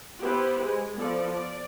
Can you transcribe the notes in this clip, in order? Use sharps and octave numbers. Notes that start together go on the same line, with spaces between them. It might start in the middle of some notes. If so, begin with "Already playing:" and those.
B3 E4 G4 B4 C5
G#3
F3 B3 A4 D5
D5